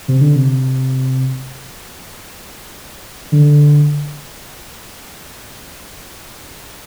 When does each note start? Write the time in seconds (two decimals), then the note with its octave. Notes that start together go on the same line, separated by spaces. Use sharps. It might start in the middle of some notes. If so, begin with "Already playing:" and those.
0.08 C3
0.21 D3
0.35 C3
3.32 D3